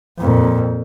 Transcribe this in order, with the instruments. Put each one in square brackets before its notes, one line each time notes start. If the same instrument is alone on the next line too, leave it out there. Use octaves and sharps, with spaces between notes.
[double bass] F2 A#2